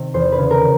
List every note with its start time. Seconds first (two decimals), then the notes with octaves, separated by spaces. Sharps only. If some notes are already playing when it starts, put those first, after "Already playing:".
Already playing: C3 D#3
0.14 E2 C5
0.32 B4
0.38 C#3
0.51 A#4